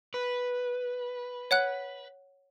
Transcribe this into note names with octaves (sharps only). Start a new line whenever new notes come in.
B4
C#5 F#5 F#6